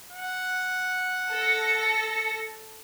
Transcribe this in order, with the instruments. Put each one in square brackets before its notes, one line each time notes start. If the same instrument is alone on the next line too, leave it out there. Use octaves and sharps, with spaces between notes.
[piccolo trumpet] F#5
[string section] A4 A#6 C#7